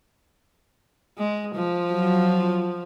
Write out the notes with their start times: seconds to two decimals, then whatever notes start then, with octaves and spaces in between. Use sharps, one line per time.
1.18 G#3
1.55 F3
1.93 F#3 F4